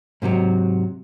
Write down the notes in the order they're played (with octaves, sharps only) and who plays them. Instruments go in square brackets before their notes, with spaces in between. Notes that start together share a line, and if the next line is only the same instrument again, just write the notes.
[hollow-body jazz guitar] G#2 C3 F3 F#3